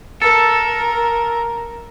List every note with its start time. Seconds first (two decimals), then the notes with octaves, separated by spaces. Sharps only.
0.22 A4 A#4